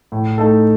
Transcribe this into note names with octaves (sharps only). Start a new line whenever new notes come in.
A2
A3 D#4 A4